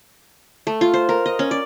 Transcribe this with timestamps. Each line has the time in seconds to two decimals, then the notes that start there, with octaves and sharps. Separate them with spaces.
0.67 A3
0.81 F4
0.94 C5
1.09 A#4
1.26 D#5
1.39 C#4
1.51 D5